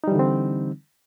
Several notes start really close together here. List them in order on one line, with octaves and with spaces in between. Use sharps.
D#4 G3 E3 D3 C4